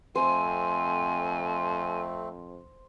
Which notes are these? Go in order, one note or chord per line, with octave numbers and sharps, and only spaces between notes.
F2 A3 C4 C5 G#5